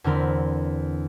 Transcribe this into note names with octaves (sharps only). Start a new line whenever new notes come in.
E2 D3 C4 A#4 B5